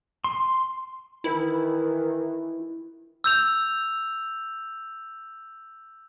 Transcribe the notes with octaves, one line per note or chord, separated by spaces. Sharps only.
C6
D#3 E3 E4
E6 G6 F7